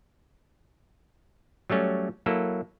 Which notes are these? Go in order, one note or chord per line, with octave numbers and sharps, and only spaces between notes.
F#3 G3 A3 C#4
F#3 A#3 E4 A4